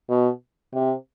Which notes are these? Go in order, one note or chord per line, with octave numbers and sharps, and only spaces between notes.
B2
C3